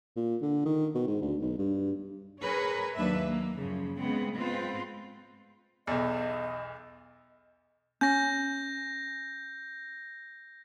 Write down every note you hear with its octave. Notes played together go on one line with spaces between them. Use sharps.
A#2
D3
D#3
B2
G#2
D2
B1
G2
G#4 A#4 B4 C#5
D#2 F#3 D4 B4 E5
A#3
F#2 C#3 F3
C#3 G#3 B3 C4
G#3 B3 C4 F4 B4 C5
B1 E2 D#5
C#4 G6 A#6